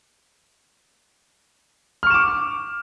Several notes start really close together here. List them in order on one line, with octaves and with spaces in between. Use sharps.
F6 C#6 E7 D6